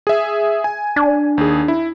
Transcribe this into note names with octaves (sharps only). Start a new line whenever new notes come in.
G#4 E5
G#5
D4
D#2 G#4
E4